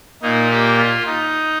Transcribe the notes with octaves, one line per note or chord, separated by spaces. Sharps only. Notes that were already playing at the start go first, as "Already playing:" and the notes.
A#2 A#3 D#4
G4
F4
D#4